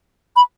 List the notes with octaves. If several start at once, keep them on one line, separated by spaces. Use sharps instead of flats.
B5